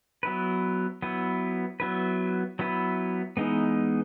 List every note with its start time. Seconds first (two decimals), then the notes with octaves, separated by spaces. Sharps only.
0.23 F#3 B3 E4 B4
1.02 F#3 B3 E4 B4
1.80 F#3 B3 E4 B4
2.59 F#3 B3 E4 B4
3.37 E3 G#3 B3 D#4